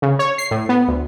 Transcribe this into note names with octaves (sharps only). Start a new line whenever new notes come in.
C#3
C#5
C7
A2
B3
D2